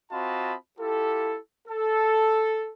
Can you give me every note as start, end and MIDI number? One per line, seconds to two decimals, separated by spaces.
0.12 0.55 60
0.12 0.55 65
0.12 0.55 66
0.12 0.55 75
0.12 0.55 81
0.12 0.55 83
0.79 1.37 64
0.79 1.37 65
0.79 1.37 67
0.79 1.37 69
1.68 2.69 69